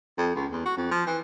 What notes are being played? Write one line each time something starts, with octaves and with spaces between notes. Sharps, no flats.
F2
C#2
E2
F#4
F2
F3
E3